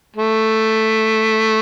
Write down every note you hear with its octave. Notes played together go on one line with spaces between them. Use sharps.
A3